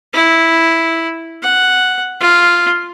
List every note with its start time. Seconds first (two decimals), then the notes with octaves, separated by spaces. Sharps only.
0.14 E4
1.43 F#5
2.20 F4